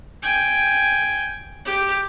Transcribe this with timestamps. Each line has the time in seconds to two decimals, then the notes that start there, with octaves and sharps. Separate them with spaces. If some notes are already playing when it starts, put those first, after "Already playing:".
0.23 G5 G#5
1.65 G4